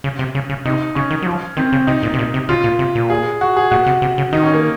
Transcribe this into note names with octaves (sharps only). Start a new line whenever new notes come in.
C#3
C3
C#3
C#3
C3 D#4
C#3 C#4
D#3
F#3
F3
D#3 C4
C#3
C3 D#4
A#2
C3
A#2
C3
C#3 F4
A#2
C3
A#2
G#4
F#4
G#4
A#2 F#4
C3
C3
C#3
D#3 D#4
C#4
A#3